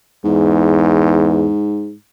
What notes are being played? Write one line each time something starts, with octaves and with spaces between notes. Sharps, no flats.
E2 G#2